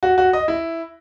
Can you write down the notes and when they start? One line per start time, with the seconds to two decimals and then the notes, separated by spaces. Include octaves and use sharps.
0.03 F#4
0.18 F#4
0.33 D#5
0.48 E4